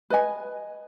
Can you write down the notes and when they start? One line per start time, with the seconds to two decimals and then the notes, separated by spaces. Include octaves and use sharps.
0.10 B4 D#5 G#5